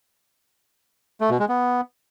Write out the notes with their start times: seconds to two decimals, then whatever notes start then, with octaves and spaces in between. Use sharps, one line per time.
1.21 A3
1.30 B2
1.39 G#3
1.49 B3